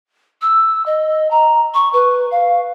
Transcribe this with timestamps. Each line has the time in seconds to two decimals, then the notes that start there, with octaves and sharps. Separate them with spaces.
0.42 E6
0.86 D#5
1.31 A#5
1.74 C#6
1.93 B4
2.31 F5